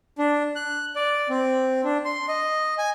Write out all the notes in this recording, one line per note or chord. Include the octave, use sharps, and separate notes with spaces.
D4
F#6
D5
C4
D4
C6
D#5
G#5